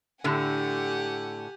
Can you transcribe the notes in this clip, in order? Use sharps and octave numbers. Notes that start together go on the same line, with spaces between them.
A2 D3 G4 F#5 G#5